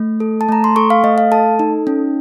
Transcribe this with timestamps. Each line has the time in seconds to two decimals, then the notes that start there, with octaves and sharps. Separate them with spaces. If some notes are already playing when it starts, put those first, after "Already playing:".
Already playing: A3
0.20 A4
0.41 A5
0.49 A3 A#5
0.64 C6
0.76 A4 C#6
0.90 F5
1.04 A3 D#5
1.18 F5
1.32 A4 A5
1.59 D#4
1.87 C#4